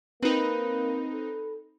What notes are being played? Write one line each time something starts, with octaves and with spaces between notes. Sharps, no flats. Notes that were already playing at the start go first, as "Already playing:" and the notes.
A#3 C4 D#4 B4
A4